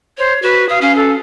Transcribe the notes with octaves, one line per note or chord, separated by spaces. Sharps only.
C5 C#5
F#4 B4
F5 D#6
C#4 F5
A4